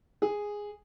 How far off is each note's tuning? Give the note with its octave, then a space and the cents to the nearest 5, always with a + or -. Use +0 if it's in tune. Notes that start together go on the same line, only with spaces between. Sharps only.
G#4 -5